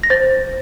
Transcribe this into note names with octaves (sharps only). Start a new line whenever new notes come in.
A#6
C5 A6